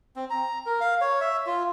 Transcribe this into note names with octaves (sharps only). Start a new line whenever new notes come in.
C4
A#5
A#4
F5
C#5
E5
F4